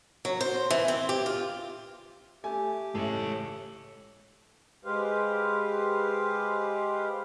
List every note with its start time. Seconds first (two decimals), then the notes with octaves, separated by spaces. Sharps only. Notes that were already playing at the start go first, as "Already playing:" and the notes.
0.25 F#3
0.41 C5
0.70 E3
0.88 C4
1.09 G4
1.26 F4
2.44 A3 G4 G#5
2.95 A1 G#3 A4 C#5
4.85 G#3 G4 B4 C5 F5